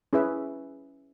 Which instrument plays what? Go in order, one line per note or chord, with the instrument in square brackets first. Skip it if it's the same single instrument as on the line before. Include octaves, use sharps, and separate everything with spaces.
[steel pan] C#4 E4 G#4 B4 E5